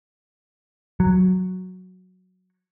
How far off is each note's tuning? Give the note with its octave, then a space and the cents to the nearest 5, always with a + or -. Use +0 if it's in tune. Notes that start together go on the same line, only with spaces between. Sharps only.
F#3 -5